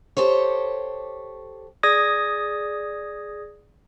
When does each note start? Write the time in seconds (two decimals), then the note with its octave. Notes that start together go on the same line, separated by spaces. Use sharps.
0.17 G4 A4 C5 C#5
1.83 G#4 D5 D#6 G#6 A#6